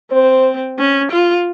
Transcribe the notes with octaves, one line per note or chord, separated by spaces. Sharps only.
C4 C5
C#4
F4